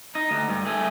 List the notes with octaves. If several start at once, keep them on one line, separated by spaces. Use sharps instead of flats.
D#4
D2
G2
A3 G#4